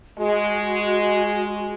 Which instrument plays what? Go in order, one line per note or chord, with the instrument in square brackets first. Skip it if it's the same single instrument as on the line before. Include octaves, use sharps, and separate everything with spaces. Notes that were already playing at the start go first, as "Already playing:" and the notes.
[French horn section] G#3 [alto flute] F#4